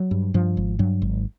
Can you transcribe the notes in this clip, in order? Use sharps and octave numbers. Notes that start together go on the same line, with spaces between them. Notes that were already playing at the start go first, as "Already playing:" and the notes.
Already playing: F#3
G2
G2 F3
G#1
G2 F#3
G#1